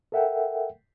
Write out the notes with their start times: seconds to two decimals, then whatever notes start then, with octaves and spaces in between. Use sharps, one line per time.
0.12 A4 A#4 E5 F#5 G5